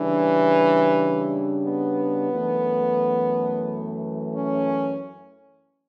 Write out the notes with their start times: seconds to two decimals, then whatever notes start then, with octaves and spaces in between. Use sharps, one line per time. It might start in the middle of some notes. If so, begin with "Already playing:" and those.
Already playing: C#3 E3 G3 D4
1.65 B3
2.33 F#2 E3 A3
4.35 C#4